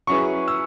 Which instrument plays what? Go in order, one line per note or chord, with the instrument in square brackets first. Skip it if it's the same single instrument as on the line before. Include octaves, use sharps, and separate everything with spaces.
[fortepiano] F#3 C#4 E4 G#4 B4 [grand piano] C#6
[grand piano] E6